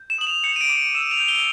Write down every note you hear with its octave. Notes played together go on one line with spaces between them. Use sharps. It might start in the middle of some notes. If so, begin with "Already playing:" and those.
Already playing: G6
E7
D#6 F#7
F7
G6 C#7
D#7
D7
D6
D#7
E6 E7
F7
G6
G7